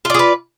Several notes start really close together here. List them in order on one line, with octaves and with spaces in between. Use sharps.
F4 D5 G#4 B4